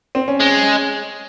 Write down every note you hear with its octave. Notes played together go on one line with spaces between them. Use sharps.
C4
C#4
G#3